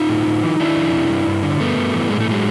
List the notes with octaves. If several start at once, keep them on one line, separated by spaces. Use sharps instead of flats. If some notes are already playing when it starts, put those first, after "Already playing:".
Already playing: D#4 F4
A2
A2
E3
D#3 D4 E4
F2
C3
G2
G2
D3
G2 A3 B3
G2
E3
A2 G#3
A3
A2 F#3 G#3